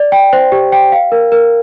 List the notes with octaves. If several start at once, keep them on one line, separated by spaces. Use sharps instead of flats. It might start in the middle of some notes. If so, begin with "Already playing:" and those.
Already playing: D5
G5
C5
G4
G5
F5
A#4
A#4